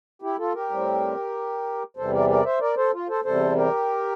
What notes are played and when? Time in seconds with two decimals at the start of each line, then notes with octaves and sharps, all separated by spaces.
0.22 E4 G4
0.39 F4 A4
0.54 G4 A#4
0.70 A2 G3 C4
1.97 E2 C3 E3 G3 A4 C5
2.13 A#4 D5
2.30 A#4 D5
2.44 C5 E5
2.60 A#4 D5
2.77 A4 C5
2.93 F4
3.09 A4 C5
3.24 E2 C3 G3 A4 C5
3.56 G4 A#4